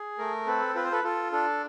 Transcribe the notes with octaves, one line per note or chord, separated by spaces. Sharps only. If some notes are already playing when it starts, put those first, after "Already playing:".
Already playing: G#4
A3 A#4
C4 A4 B4
F4 B4
C5
A4 B4
F4 A4
D4 A4